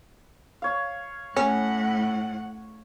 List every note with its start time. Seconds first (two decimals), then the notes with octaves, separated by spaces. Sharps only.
0.62 C#5 F5
1.36 A2 C#4 F#5